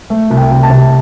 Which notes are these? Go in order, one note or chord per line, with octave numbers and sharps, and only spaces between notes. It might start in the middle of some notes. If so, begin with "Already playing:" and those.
A3
C2
G5
C2
A5
C3